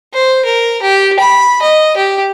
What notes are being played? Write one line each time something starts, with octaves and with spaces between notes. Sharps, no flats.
C5
A#4
G4
B5
D#5
G4